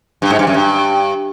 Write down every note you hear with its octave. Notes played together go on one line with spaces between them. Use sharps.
G2
G#2
G2
F#2
G2